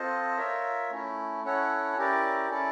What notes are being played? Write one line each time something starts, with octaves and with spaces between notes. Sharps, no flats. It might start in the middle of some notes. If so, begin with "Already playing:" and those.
Already playing: C4 F4 A4 C5 D#5
F4 A#4 C#5 E5
A3 C#4 E4
C#4 E4 A4 C#5 F#5
C#4 E4 G4 A#4 D5
C#4 E4 A4 D5